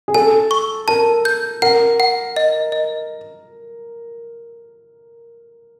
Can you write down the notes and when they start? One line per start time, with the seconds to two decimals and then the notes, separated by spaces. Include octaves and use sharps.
0.08 G#4
0.14 A4 G#5
0.51 C#6
0.88 A#4 A5
1.25 G6
1.62 A#4 F#5
2.00 F#5
2.36 D#5
2.72 D#5